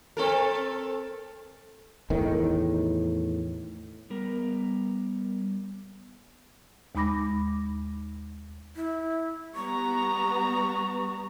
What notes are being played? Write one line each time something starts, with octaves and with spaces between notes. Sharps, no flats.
C4 A4 A#4
E2 A2 D#3
G3 B3 A#4
D#2 G#3 D#4 B5 D6 A#6
E4
G3 B3 A#5 C#6